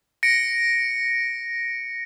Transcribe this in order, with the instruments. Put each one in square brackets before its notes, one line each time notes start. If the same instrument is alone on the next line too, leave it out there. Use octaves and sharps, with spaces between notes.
[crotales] A#6 C#7 D7